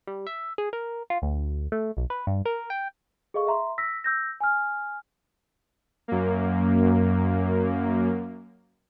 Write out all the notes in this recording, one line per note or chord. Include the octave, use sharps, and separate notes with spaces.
G3
E5
G#4
A#4
F4
D2
A3
B1
B4
G2
A#4
G5
G#4 A4 D#5 F5 C#6
E5 A#5 C6
E6 A#6 B6
E6 G6 A#6
G#5 F6
F#2 A#3